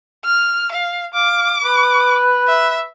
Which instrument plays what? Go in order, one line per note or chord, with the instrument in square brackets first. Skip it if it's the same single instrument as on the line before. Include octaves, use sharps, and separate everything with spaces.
[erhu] F6
F5
[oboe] F5 [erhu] D6
[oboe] B4
[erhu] E5